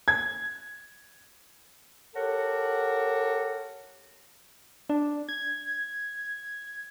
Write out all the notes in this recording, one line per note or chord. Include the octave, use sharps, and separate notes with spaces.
G#6
G4 A4 A#4 C#5 F#5
D4
G#6